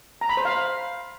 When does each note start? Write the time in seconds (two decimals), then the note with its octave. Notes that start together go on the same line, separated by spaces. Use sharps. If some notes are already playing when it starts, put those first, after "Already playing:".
0.21 A#5
0.29 B5
0.37 C5
0.45 F5